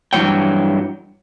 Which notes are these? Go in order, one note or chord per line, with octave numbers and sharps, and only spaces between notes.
G2 E3 F#3 G#3 C#5 G5